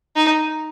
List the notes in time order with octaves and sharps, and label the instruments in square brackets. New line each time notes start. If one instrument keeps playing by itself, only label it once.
[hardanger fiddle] D#4